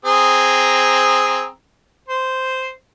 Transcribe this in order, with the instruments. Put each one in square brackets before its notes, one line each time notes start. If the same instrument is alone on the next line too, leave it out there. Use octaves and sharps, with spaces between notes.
[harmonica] C4 G#4 A#5
C5